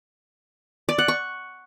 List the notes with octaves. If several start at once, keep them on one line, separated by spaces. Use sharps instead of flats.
D5
F#5
C#6